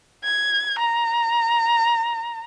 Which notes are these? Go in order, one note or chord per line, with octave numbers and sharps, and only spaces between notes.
G#6
A#5